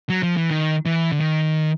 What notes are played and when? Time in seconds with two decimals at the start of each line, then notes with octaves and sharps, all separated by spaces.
0.09 F#3
0.23 F3
0.37 E3
0.50 D#3
0.86 E3
1.12 D3
1.20 D#3